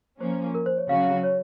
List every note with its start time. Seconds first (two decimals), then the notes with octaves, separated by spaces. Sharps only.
0.20 F3 A#3 C#4 C5
0.55 A#4
0.66 C5
0.77 C#5
0.89 C#3 F#3 C#4 F#4 F5
1.23 C#5